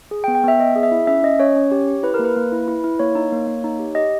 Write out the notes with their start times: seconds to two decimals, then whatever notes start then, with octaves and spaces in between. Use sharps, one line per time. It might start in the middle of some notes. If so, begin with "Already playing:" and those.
0.11 G#4
0.24 G5
0.28 B3
0.35 G5
0.43 B3 E5
0.59 B3 D#5
0.76 G#4
0.83 E5
0.92 E4
1.07 C#4 E5
1.23 C#4 D#5
1.39 C#4 C#5
1.56 C#4
1.71 G4
1.88 G4
2.03 E4 B4
2.14 A#4
2.19 A#3
2.24 B4
2.36 A#3
2.52 E4
2.68 E4
2.84 E4
2.99 A#3 C#5
3.15 D#4
3.32 A#3
3.47 A#3
3.64 D#4
3.79 G4
3.95 G4 D#5